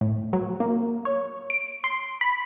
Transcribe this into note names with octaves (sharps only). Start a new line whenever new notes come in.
A2
F#3
A#3
C#5
D7
C6
B5